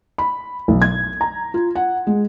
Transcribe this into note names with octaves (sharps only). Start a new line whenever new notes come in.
B5
B1
G#6
A#5
F4
F#5
G#3